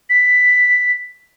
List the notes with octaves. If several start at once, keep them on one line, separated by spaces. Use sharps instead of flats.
B6